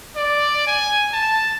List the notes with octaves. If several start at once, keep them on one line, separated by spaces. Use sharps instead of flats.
D5
G#5
A5